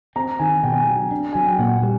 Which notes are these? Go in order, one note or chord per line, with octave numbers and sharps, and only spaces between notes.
C4 A#5
D#3 G#5
B2 G5
G#5
G5
F#3
D4
F#3 G#5
G5
A#2 F#5
G3